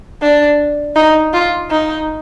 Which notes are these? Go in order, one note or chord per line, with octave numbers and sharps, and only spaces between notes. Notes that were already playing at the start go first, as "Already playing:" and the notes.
D4
D#4
F4
D#4